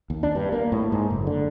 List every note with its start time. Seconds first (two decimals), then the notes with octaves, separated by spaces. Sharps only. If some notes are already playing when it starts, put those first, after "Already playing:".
0.10 D#2
0.23 D4
0.35 G2
0.52 A#3
0.72 A2
0.92 G#2
1.10 F#1
1.27 D3